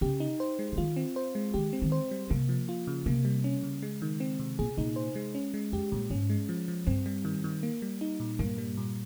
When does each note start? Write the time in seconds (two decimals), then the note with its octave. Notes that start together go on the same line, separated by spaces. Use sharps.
0.01 C#3 G4
0.20 D#4
0.40 C5
0.59 G#3
0.72 C#3
0.77 D#3 F4
0.96 C4
1.16 C5
1.35 G#3
1.54 D#3 G4
1.73 C4
1.82 D#3
1.92 C5
2.11 G3
2.30 C3 A#3
2.49 F3
2.69 F4
2.87 C#3
3.06 C3 A#3
3.25 G3
3.44 C#4
3.63 C#3
3.82 G#3
4.02 D#3
4.20 C4
4.39 C3
4.59 A#2 G#4
4.77 A#2 D#4
4.96 C5
5.16 G#3
5.35 C#4
5.54 G#3
5.72 F2 G4
5.92 G2 A#2
6.10 G#2 C#4
6.30 G#3
6.49 F3
6.68 F3
6.87 G2 C4
7.06 G3
7.25 D#3
7.44 D#3
7.63 A#3
7.82 G3
8.01 D#4
8.20 A#2
8.39 G2 A#3
8.58 G3
8.77 A#2